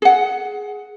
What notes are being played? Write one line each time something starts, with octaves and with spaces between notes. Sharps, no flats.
G#4 F#5